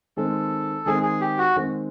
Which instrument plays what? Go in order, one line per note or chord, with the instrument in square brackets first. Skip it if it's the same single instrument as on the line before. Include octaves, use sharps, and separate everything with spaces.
[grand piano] D#3 G#3 C4 [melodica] A4
[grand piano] D#3 G#3 C4 [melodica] G#4
[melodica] G#4
G4
F#4
[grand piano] D#3 G#3 C4